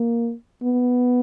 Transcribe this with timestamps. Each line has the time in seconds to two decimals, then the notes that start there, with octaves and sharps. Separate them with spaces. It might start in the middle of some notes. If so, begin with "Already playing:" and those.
Already playing: A#3
0.63 B3